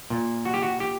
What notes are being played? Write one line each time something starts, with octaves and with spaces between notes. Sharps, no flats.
A#2
F#4
G4
F#4
G4